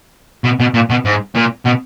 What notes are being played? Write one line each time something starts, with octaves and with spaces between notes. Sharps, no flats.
B2
B2
A#2
B2
G#2
A#2
B2